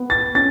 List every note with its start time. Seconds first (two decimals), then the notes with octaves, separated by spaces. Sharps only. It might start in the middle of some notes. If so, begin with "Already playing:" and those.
Already playing: B3
0.10 A6
0.35 C#4 A6